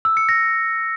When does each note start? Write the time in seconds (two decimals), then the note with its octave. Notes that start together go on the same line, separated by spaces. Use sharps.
0.05 E6
0.17 C#7
0.29 A#6